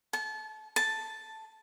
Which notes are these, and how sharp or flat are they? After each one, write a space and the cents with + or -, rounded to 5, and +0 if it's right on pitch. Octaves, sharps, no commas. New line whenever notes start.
A5 -30
A5 +0